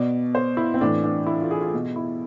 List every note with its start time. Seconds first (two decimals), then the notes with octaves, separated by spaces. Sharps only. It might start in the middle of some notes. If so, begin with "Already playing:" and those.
Already playing: B2 D5
0.35 C5
0.57 E4
0.74 C4
0.81 A2 E3 D4
1.04 D4
1.27 E4
1.41 F4
1.51 G#4
1.62 F4
1.74 B2
1.96 E4